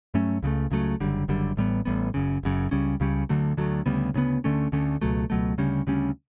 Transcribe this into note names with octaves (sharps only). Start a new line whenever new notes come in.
G2 F#3 A3 C#4
C#2 C#3 F#3 A3
C#2 C#3 F#3 A3
F#1 F#2 D3 G3
F#1 F#2 D3 G3
A1 A2 G3 B3
A1 A2 G3 B3
F#1 F#2 C#3
F#1 F#2 C#3
C#2 C#3 G3 C#4
C#2 C#3 G3 C#4
D2 D3 F#3 A3
D2 D3 F#3 A3
D2 C#3 G3 B3
D2 C#3 G3 B3
D2 D3 A3 C#4
D2 D3 A3 C#4
C#2 B2 F#3 A3
C#2 B2 F#3 A3
D2 C#3 G3 C#4
D2 C#3 G3 C#4